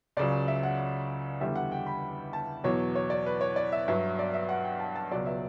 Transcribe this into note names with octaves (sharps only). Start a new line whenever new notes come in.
C#2 C#3 F#3 D5
E5
F#5
E2 D3 G3 E5
F#5
G5
B5
A5
E2 B2 F#3 C#5
C#5
D5
B4
C#5
D5
E5
G2 F#3 E5
D5
E5
F#5
G5
A5
A5
C#2 B2 F#3 D5
E5